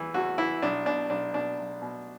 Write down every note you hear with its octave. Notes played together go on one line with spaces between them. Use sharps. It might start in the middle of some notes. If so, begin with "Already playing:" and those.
Already playing: E2 E3
E2 F#4
E3 E4
B1 D4
B2 D4
B1 D4
B2 D4
B1
B2